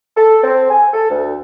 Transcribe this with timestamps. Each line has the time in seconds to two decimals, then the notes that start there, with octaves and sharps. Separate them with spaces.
0.16 A4
0.44 C4
0.70 G#5
0.93 A4
1.10 D2